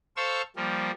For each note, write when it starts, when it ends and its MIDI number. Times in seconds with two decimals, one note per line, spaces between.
0.17 0.42 69
0.17 0.42 72
0.17 0.42 77
0.17 0.42 85
0.17 0.42 88
0.56 0.91 53
0.56 0.91 55
0.56 0.91 58